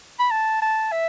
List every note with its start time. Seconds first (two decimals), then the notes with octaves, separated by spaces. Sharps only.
0.20 B5
0.31 A5
0.62 A5
0.92 E5